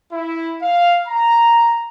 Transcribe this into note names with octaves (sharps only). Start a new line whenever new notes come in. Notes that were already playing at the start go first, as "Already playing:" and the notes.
E4
F5
A#5